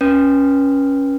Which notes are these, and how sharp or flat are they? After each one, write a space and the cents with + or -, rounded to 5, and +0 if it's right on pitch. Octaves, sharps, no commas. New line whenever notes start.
C#4 +0 B4 -25